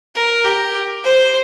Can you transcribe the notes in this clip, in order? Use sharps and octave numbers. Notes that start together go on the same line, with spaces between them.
A#4
G4
C5